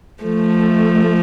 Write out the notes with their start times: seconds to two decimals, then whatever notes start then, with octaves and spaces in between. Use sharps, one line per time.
0.23 F3 A3